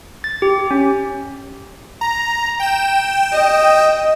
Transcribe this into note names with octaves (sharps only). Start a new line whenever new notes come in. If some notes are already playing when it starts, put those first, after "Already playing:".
A6
G4
C#4
A#5
G5 E7
D#5